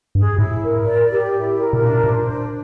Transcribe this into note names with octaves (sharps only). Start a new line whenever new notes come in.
G2 G#4
A2 E4
A#4
D5
G4
E4
A#4
B2
A#2 D4
A#2 C5
D4